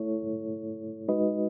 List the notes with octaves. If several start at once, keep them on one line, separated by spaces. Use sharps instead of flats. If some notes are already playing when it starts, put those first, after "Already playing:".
Already playing: A3 E4 A4 C#5
G#3 D#4 F#4 B4 D#5